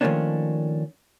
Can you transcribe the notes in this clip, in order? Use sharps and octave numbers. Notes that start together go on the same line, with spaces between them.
D#3 F3 A3 A#3 C#4 D4